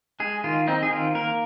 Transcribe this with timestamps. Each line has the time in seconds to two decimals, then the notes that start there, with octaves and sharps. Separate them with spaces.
0.20 G#3 G#4
0.44 D#3 F4
0.68 C4 D#4
0.83 G#4
0.91 D#3 F4
1.15 A#3 A#4